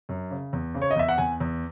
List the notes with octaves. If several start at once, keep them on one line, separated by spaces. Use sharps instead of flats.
F#2
C#3
E2
C#3
C#5
D#5
E2 E5
F#5
E2 G#5
E2